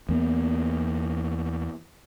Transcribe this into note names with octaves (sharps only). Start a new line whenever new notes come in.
E2 A#3 B3